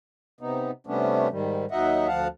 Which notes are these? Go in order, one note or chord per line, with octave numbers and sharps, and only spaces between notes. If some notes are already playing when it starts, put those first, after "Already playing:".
C3 B3 D#4
C3 G3 A3 B3 C#4 D4
G#2 D#3 G3
D#2 F#3 D#4 D#5 E5 F#5
D2 F3 F5 F#5 A5